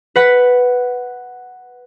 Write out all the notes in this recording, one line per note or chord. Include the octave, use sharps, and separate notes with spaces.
B4 F#5 B6